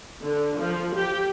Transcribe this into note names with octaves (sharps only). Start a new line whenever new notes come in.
D3
F3
G4